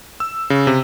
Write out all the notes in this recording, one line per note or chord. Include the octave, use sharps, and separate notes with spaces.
E6
C#3
C3